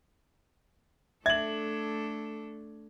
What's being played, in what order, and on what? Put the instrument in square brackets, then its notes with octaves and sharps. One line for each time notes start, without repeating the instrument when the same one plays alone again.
[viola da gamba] A3 D4 A4 [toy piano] E5 [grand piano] G#6 F#7